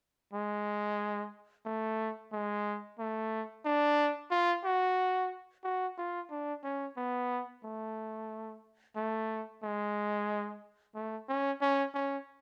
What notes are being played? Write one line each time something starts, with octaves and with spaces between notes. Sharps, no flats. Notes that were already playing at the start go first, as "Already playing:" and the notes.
G#3
A3
G#3
A3
D4
F4
F#4
F#4
F4
D4
C#4
B3
A3
A3
G#3
A3
C#4
C#4
C#4